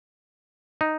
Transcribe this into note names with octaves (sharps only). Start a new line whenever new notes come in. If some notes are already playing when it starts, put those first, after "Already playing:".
D#4